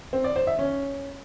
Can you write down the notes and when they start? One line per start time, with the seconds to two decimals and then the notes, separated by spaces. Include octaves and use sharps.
0.13 C4
0.24 D5
0.36 C5
0.47 E5
0.59 C#4